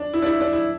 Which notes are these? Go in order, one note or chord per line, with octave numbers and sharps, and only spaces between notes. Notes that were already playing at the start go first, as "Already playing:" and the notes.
Already playing: D4
E4
D4
E4
D4
E4